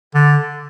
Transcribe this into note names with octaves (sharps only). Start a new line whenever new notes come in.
D3